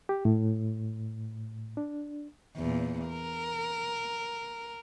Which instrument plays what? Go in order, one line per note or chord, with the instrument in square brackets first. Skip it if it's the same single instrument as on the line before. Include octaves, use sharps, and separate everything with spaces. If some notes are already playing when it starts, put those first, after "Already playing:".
[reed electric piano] G4
A2
D4
[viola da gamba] E2 A#2
A#4